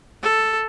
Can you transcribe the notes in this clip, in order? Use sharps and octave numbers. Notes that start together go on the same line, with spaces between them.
A4